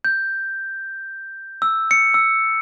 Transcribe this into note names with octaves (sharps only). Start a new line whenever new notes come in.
G6
E6
C#7
E6